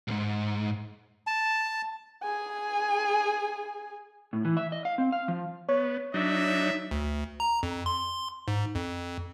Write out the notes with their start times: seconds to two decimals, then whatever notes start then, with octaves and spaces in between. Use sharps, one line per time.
0.08 C2 G#2
1.27 A5
2.23 G#4 G#5
4.33 A2
4.45 E3
4.57 E5
4.72 D#5
4.85 F5
4.98 C4
5.12 F5
5.28 F3
5.69 B3 C#5
6.14 F#3 D4 D#4 E5
6.91 D2
7.40 A#5
7.63 F2
7.86 C6
8.48 G#2
8.75 F2